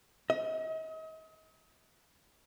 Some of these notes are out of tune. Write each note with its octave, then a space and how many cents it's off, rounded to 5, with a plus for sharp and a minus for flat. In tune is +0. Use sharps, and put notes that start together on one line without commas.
D#5 +40